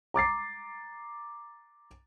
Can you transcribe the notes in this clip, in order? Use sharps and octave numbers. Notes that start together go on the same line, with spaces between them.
A#5 D6 A6 C7